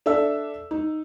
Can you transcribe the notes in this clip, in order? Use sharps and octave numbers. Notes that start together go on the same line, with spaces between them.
D4 A4 E5 E6
D#4